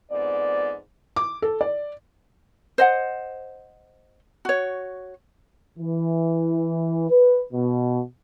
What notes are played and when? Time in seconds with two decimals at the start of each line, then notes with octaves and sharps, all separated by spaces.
0.10 F2 G#2 B3 D5
1.16 D6
1.42 A4
1.61 D5
2.78 C5 D#5 F#5
4.45 F#4 C#5
5.78 E3
7.10 B4
7.53 B2